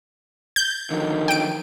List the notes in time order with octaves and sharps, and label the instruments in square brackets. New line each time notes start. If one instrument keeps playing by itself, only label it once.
[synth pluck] G6
[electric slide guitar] D3 F3 F#3 [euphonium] D#3
[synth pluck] G5 D7